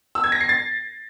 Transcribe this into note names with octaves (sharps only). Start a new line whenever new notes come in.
E6
G#6
A#6
C7
A6